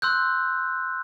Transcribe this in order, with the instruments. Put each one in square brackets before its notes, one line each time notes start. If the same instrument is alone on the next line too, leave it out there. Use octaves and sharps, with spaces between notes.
[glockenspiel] C6 E6 F#6 G6